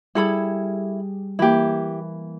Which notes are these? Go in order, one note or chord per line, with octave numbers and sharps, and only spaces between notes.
G3 E4 G#4 A4 B5
E3 A#3 E4 G4